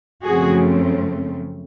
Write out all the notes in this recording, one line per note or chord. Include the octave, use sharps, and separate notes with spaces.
F#2 C#3 F3 A3 C4 F#4 G#4